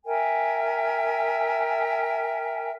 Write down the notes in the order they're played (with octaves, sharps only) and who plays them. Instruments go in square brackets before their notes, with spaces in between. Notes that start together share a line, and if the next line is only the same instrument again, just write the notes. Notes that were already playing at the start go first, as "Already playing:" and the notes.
[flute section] A#4 E5 G5 G#5